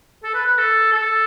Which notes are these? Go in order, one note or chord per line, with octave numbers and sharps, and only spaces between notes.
A4
B4
B4
A4
A4